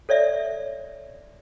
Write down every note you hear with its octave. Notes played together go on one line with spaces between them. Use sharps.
A4 C#5 D5 E5